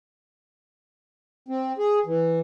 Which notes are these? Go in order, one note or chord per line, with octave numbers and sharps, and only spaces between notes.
C4
G#4
E3